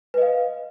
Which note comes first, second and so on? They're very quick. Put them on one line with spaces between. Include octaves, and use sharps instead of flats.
B4 D#5 F5